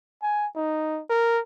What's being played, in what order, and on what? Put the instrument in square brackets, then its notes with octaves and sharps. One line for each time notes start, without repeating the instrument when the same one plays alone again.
[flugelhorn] G#5
D#4
A#4